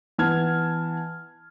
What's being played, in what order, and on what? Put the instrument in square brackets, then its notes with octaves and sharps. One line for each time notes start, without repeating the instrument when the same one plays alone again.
[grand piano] E3 B3 A5 F6 G#6